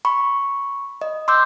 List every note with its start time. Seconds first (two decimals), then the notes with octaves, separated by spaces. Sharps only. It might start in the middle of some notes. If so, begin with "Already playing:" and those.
0.05 B5 C#6
1.01 D#5
1.28 C6 D6 E6 G6